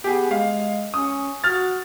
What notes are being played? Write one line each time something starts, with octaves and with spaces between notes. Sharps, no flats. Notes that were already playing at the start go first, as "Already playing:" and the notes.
B3 G4 G#4
G#3 F5
C#4 D#6
F#4 F6 A6